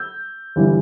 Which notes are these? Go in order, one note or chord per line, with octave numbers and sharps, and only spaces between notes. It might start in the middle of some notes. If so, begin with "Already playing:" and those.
Already playing: E6 G6
G1 E3 G3